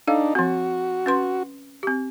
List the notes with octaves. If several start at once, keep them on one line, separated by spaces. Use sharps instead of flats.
D4 D#4 A4 F5
F3 C4 F#4
C#4 B4 C6
C4 G4